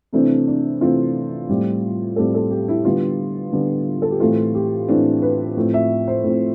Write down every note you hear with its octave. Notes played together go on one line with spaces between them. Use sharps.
C3 E3 A3 C4 D4
D4
C3 E3 A3 C4 F4
A2 G3 C4
A2 G3 C4 A4
A4
G4
E4
D3 G3 B3 F4
D3 G3 B3
A4
G4
A2 E3 A3 C4 F4
G4
A2 E3 A3 C4 D4
B4
A2 F3 C4
E5
C5
A2 F3 C4